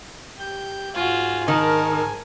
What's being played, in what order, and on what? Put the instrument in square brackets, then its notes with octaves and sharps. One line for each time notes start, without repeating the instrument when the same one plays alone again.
[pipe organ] G4 G6
[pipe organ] G#2 G#5 [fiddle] F4 F#4
[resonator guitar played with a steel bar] D#3 [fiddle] A#4 A5